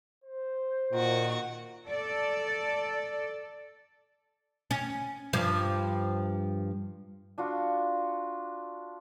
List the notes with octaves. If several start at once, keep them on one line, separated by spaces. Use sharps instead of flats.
C5
A#2 D#3 F#4
A4 D5
C#4
G2 F3
D4 F4 F#4